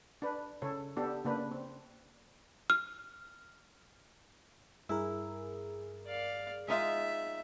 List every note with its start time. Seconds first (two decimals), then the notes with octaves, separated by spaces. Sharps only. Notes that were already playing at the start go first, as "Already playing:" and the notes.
0.22 D4 B4
0.62 C#3 A4 C#5
0.97 B3 D4 G4 A4
1.25 C#3 A#3 D4 B4
1.51 C4
2.70 F6
4.89 G2 E4 G#4 A#4
6.06 D5 F5
6.68 G#3 D#4 F4 E5